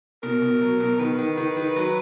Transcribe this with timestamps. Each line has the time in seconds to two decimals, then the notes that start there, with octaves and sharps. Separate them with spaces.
0.23 B2 A#4
0.42 B2
0.61 F#3
0.80 B2
0.99 D#3 B4
1.19 D#3
1.37 D#3
1.57 D#3
1.76 F#3